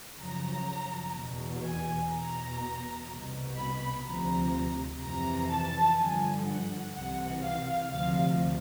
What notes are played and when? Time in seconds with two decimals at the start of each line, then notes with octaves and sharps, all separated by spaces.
0.18 F#2 C#3 F3 A#5
1.14 E2 B2
1.63 G#5
2.10 E2 B2 A#5
3.07 C2 B2
3.55 B5
4.03 D2 C3 F3 A#5
5.00 F2 C3 E3 A#5
5.49 A5
5.97 G2 D3 F3 G#5
6.45 F#5
6.93 C2 C3 E3 F#5
7.42 F5
7.90 D2 C3 F3 F5